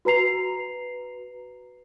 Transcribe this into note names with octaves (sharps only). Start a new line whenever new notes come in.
F#4 B4 A#5 C7 F7